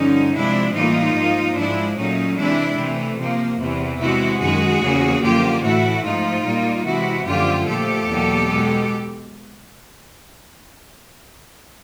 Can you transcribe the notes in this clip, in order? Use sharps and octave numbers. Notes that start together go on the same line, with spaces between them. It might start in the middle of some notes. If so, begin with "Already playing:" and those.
Already playing: G2 D3 F3 C#4 D#4
C3 F3 G#3 D4 E4
A2 E3 G3 A#3 D#4 F4
G#2 F3 A#3
G#2 F3 G#3 D4 E4
A#2 F#3 A3 C#4 D#4
C3 E3 G#3 D4 E4
C3 E3 A3
C3 F3 A#3
E2 C3 E3
C3 E3 G#3 E4 F#4
F#2 D#3 G#3 F#4 G#4
E2 C#3 F3 A#3
F#2 D3 F3 A#3 F4 G4
A2 E3 A3 E4 F#4
G#2 F3 A3 D#4 F4
A#2 G3 A#3
C3 E3 G#3 E4 F#4
F#2 D3 F3 A3 F4 G4
A#2 F3 A3 G4 A4
E2 B2 F#3 A#3
B2 G#3